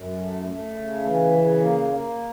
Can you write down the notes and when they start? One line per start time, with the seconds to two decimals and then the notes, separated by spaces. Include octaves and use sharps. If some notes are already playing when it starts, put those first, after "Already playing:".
Already playing: F#2
0.16 A3
0.45 A3
0.73 C#3
1.02 E3
1.31 C#3
1.59 A#3
1.88 A#3